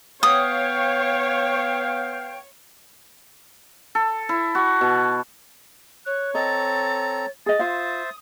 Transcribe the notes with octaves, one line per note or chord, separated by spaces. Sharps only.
B3 C#5 F5 G5 D#6
A4
E4
F#4
B2
C#5 F#6
C4 A4 D#5 A#5 A6
G#4 D#5 A6
F4 C5 E5 F5 D#6